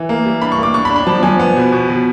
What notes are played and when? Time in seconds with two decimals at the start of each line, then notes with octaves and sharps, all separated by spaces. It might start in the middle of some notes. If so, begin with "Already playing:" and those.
Already playing: E3
0.09 A#3
0.25 G3
0.41 D4 B5
0.52 C#6
0.57 A#3
0.63 D6
0.74 D4 C#6
0.85 B5
0.90 D4
0.96 B5
1.07 F3 A5
1.23 F3 G#5
1.39 B3
1.56 B2
1.72 B2
1.89 B2